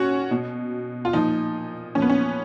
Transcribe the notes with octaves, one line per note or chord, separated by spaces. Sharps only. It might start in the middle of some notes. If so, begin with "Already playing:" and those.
Already playing: A#2 C#4 F#4
B2
F4
A#2 F3 D#4
A#2 F3 C#4
B3
C#4